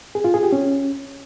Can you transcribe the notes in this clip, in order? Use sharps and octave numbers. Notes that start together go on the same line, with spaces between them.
G#4
F4
G#4
G4
C#4